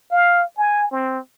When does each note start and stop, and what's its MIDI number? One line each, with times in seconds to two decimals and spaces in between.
0.11 0.43 77
0.57 0.87 80
0.91 1.19 60